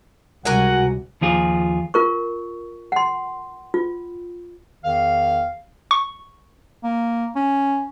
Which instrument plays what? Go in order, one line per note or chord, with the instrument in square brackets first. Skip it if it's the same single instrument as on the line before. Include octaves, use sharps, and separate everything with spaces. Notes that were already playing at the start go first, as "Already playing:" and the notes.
[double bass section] C#2 C3 G3 [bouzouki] F#4 A#4 G#5 [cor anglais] F#5
[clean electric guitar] D#2 F3 F4 G#4
[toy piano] F4 A#4 C#6
F#5 C6
F4
[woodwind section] E2 D#3 F5
[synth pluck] C#6
[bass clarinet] A#3
C#4